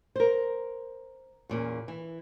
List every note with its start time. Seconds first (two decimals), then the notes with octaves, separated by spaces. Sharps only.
0.16 A#4 C5
1.50 E2 A#2 C#4
1.88 E3